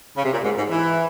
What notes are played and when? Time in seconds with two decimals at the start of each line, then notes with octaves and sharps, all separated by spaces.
0.17 C#3
0.23 C3
0.31 A#2
0.43 G#2
0.56 G#2
0.69 E3